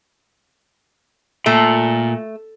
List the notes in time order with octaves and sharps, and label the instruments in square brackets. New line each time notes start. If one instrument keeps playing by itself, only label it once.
[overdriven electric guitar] A#2 [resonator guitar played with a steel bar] A3